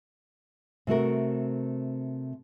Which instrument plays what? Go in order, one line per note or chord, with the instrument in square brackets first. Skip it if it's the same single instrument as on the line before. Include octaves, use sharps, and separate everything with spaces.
[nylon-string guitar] C3 A3 F#4 A#4